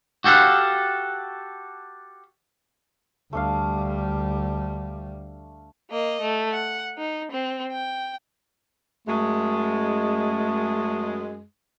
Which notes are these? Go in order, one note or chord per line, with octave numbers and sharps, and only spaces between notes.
F#4 G4 A4 F5 F#5
D2 G3 A3 D4 F5
A#3 D#5
A3
F#5
D#4
C4
G5
F#2 G#3 A3